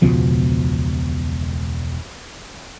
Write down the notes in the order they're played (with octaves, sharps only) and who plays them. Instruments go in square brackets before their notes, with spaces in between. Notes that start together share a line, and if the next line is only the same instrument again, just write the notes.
[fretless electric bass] E1 C#2 B2 F3